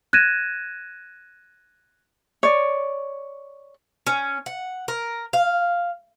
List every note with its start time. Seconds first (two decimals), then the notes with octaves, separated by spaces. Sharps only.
0.13 F#6 G#6 A#6 D#7 E7
2.43 C#5 D5
4.07 C#4
4.46 F#5
4.88 A#4
5.33 F5